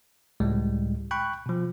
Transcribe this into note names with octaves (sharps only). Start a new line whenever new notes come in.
C#2 A2 G3 G#3
G5 B5 C#6 F#6
B2 F3